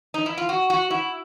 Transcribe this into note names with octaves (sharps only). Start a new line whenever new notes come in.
D#4
E4
F4
F#4
F#4
E4